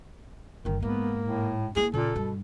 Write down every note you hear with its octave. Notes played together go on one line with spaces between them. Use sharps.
G1 D3 D#3
G#2 A#3 B3
A2
A#3 E4 G#4
A#2 C#3 A4
G2 B2